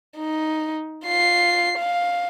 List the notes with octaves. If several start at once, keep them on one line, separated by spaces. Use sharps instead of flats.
D#4
F4 C7
F5